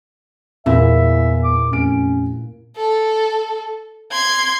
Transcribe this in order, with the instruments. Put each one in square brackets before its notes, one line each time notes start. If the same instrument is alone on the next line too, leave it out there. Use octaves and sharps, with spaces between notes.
[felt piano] E2 [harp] A#2 E4 [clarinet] E5
[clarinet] D6
[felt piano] F1 D7 [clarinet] C#4
[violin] A4
C6 G#6